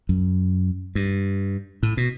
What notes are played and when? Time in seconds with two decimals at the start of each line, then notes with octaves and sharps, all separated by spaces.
0.09 F#2
0.95 G2
1.83 A2
1.97 B2